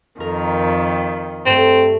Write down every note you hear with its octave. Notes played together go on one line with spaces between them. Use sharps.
F2 D#3 A#4
G2 A3 C4